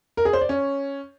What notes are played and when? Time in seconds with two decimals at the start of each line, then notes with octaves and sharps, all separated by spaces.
0.17 A#4
0.25 G#4
0.33 C5
0.41 D5
0.49 C#4